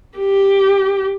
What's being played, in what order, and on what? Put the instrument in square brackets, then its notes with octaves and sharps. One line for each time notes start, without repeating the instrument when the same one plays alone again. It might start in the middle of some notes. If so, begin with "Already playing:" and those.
[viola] G4